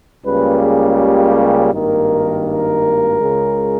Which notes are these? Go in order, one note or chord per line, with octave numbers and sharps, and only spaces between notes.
C#2 C#3 G3 A#3 B4
G#4
G4
G#1 G2 D#3 A#3 A#4
A#4
C#2 C#3 G#3